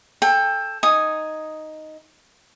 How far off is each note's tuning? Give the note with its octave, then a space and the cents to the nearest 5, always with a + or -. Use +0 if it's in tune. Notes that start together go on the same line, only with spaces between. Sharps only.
A4 +0 G5 +25
D#4 +0 G#5 +0 D#6 +0